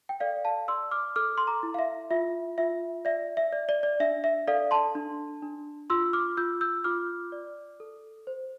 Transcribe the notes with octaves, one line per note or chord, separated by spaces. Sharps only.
G5
A4 D5 F5
F5 A5
D5 C6 E6
D6 F6
A4 D6 F6
C6
A#5 D6
E4
F5
E5
F4 E5
F4 E5
D5 E5
E5
D5
D5
D5
D4 E5
E5
A4 D5 F5
A5 C6
D4
D4
F4 C6 E6
D6 F6
F4 E6 G6
E6 G6
F4 D6 F6
D5
A4
C5